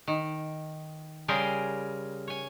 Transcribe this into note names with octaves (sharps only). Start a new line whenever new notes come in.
D#3
C#3 G3 G#4 A#4 C5 G5
C#5 G#5